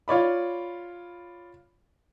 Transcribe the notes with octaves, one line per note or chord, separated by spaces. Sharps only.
F4 C#5 D5 B5